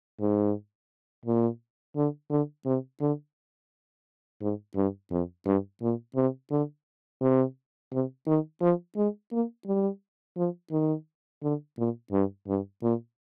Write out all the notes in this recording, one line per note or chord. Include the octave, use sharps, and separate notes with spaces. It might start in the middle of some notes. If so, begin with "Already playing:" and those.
G#2
A#2
D3
D3
C3
D3
G#2
G2
F2
G2
A#2
C3
D3
C3
C3
D#3
F3
G#3
A#3
G3
F3
D#3
D3
A#2
G2
G2
A#2